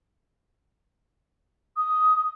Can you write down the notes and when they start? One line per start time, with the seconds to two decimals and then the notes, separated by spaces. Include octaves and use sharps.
1.77 D#6